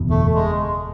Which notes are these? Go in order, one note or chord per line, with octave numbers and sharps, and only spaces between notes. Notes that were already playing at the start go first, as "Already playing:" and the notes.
Already playing: F#1 E2 B2
A3
G#3